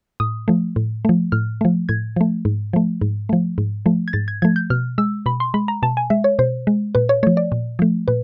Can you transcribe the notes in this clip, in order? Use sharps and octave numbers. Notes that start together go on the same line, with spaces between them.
A2 D#6
F3 A3
A2
F3 A3
A2 F6
F3 A3
A2 G#6
F3 A3
G#2
F3 A3
G#2
F3 A3
G#2
F3 A3
G#6
G#2 A6
G#6
F3 A3 G#6
G6
B2 F6
G#3 E6
B2 B5
C6
G#3 B5
A#5
B2 A5
G#5
G#3 E5
C#5
B2 C5
G#3
A#2 B4
C#5
F3 A3 C#5
D5
A#2
F3 A3
A#2 B4